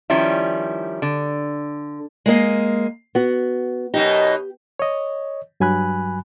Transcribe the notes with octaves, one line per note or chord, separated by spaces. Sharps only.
D#3 F3 G3 C#4 E4
D3
G#3 A#3 D#5
B3 F#4
F#2 B2 D#4 G4
C#5 D#5
G2 F#3 G#5 B5 F#6